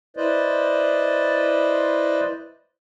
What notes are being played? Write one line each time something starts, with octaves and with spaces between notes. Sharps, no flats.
E4 B4 C5 D5 D#5